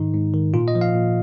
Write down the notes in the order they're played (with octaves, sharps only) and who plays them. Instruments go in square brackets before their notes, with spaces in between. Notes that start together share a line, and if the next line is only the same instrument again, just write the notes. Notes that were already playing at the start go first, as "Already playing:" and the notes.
Already playing: [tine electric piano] G#2 D#3 D#4
G#2
D#3
A#2 F4
D#5
F3
F5
A#2